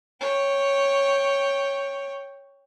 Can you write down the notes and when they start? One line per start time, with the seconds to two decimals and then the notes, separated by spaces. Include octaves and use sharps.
0.21 C#5 G5